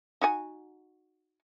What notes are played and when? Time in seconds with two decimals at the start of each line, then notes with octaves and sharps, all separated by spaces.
0.22 D#4 F#4 G#5